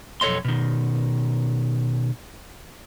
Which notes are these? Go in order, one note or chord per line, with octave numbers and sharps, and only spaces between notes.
B1 F2 A4 C#5 D#5 C6
B2 D#3